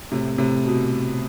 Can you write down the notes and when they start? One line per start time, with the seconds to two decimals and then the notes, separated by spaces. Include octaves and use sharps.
0.12 A2 C3
0.38 A2 C3
0.66 B2